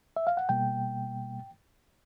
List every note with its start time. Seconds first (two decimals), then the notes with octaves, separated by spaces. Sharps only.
0.16 E5
0.27 F5
0.37 F#5
0.49 B2 G3 A#3 G5